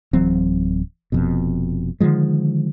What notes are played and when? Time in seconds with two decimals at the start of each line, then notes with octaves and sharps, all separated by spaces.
0.13 D1 E3 F#3 C4
1.12 F1 F2 B2
2.00 D3 D#3 F3 G#3